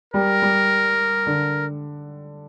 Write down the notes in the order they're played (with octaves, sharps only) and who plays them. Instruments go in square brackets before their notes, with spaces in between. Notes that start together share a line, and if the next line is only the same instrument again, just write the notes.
[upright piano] G3 [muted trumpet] A#4
[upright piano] G3
D3